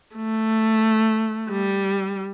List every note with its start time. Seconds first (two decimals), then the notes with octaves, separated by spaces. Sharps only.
0.16 A3
1.49 G3